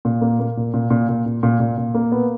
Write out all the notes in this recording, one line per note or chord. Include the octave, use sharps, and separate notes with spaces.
A#2
A#3
A#3
A#2
A#2
A#2
A#2
A#2
A#2
A#2
A#2
A#3
B3